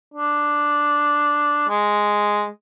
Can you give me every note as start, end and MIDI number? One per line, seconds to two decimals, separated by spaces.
0.14 1.64 62
1.69 2.48 56